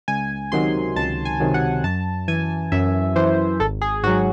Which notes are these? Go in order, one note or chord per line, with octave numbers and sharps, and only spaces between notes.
C#2 G#5
C3 D#3 F#3 C6
C#2 A5
G#5
C3 D#3 F#3
F#5
F#2 A5
E3 G#5
F#2 E5
E3 C5
G#1 A4
G#4
G#2 F#3 F#4